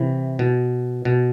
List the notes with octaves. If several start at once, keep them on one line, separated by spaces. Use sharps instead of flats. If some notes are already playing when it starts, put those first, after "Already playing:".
Already playing: C3 E3
B2
B2